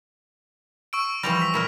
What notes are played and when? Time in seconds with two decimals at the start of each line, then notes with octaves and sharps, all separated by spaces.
0.93 C#6 E6 D7
1.23 E3 F3 G3 A#6 F7
1.42 B6
1.54 A#2 E4 A#4